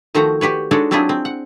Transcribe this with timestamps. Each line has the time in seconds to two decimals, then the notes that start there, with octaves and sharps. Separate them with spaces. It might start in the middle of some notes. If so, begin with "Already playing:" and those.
0.15 D#3 F3 A3 F#4 C5 A#5
0.41 F#4 G4 B4 C#5
0.71 G#3 D4 D#4 F#4 A4 C#5
0.91 F#3 C4 D4 E4 F4 G#4
1.09 C4
1.25 F#5